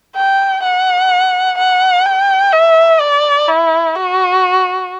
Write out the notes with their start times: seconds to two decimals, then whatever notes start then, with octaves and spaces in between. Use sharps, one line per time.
0.15 G5
0.63 F#5
1.58 F#5
2.06 G5
2.52 E5
3.00 D5
3.48 E4
3.96 F#4